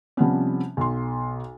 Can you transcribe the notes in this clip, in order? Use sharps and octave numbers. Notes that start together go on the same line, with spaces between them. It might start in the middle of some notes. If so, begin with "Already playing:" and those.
C3 F3 G3 B3 C#4
B1 C6